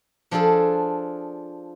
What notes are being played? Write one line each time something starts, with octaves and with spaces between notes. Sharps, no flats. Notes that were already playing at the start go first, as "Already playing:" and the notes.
F3 D4 F4 G#4 A4